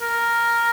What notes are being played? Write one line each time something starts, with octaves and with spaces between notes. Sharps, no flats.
A#4